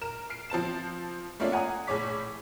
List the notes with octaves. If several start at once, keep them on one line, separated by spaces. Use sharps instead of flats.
A#4 E7
F6 C7 D7
F3 C4 A5 E7
A3 A#3 C#4 F4 D5 E5
F#5 G#5 A#5 D#6
A#1 A2 G#4 C#5 D6 B6